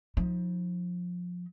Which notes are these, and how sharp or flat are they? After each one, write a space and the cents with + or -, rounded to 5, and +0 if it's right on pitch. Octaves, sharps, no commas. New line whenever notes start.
F3 +25 D#4 +35